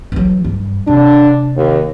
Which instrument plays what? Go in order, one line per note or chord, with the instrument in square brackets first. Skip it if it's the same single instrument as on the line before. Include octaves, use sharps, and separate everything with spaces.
[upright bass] E3 F#3
G2
[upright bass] C3 [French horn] D4
[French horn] D#2